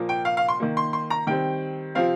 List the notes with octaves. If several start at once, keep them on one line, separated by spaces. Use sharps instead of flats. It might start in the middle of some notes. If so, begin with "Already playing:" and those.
Already playing: A#2 F3 A#3
G5
F5
F5
C6
D#3 A#3
C6
C6
A#5
D#3 G3 C4 G5
C3 F3 C4 F5